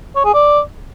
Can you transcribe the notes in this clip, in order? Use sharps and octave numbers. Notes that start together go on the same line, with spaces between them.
C#5
G#4
D5